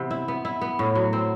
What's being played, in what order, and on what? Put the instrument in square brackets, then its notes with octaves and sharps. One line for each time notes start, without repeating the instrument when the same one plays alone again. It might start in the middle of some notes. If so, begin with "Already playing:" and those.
Already playing: [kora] C3 E3 B3
E4
B3
E4
B3
A2
F#3
C4